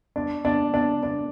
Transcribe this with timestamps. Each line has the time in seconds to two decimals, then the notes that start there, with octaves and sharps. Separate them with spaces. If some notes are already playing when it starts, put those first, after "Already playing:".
0.16 D4
0.45 D4
0.74 D4
1.03 D4